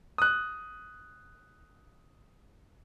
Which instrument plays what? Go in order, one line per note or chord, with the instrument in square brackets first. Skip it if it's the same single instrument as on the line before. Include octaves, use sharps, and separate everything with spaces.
[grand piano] D#6 F#6